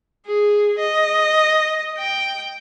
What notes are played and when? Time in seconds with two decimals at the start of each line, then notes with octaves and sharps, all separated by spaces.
0.27 G#4
0.78 D#5
1.98 G5